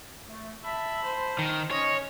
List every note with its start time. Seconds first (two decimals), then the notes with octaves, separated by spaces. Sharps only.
0.28 A3
0.64 E5 A5 B5
1.04 C5
1.39 D#3
1.71 C#4 C#5 D#5